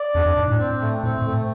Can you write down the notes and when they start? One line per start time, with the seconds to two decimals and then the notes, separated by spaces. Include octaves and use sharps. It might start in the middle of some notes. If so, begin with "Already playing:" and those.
Already playing: D5
0.15 E2 D4
0.26 F2
0.37 G#2 D4
0.48 A2
0.59 C4
0.81 A3
1.03 A2 C4
1.18 A2
1.26 A3